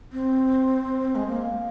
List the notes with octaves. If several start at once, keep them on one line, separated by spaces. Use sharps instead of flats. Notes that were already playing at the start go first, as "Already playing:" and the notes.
C4
G#3
A#3